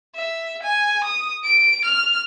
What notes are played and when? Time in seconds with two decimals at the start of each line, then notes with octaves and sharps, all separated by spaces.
0.16 E5
0.62 G#5
1.04 D#6
1.44 D7
1.85 F6